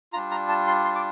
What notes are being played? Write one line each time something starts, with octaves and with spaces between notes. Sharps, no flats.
G3 D4 F4 A#5
A#5
A5
C6
C6
D6